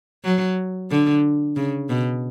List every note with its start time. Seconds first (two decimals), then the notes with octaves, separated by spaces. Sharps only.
0.24 F#3
0.91 D3
1.56 C#3
1.89 B2